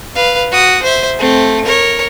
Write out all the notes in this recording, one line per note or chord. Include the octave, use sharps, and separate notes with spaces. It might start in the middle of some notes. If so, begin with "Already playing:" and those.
B4 F5
F#4 D#6
C5 E5
A3 C4
A#4 C#5